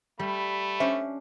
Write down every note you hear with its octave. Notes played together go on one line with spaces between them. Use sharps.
G3 A3 B5
C#4 D4 C5 E5